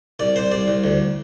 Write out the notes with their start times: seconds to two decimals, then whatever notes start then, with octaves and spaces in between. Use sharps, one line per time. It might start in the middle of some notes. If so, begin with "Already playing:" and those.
0.19 C2 D5
0.36 C2 C5
0.52 C2 D5
0.68 C2
0.84 D2